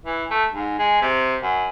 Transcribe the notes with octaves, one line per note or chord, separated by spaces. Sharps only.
E3
A3
G#2
G#3
C3
F#2